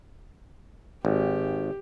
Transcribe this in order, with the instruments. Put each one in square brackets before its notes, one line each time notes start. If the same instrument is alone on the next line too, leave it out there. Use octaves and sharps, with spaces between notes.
[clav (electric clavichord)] G#1 [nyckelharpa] G4